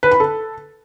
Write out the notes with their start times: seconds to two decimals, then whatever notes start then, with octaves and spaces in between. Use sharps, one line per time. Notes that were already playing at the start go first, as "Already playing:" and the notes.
0.03 B4
0.11 B5
0.20 A4